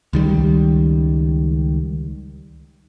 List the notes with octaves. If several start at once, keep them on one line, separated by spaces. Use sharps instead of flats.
C#2 D#3 G3